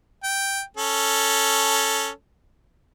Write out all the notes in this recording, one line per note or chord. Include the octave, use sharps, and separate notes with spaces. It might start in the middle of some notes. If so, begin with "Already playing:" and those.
G5
C#4 A4